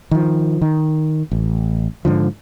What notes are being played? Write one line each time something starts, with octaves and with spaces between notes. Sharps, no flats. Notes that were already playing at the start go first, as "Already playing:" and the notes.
D#3 F3
D#3
A1
G#2 D3 F3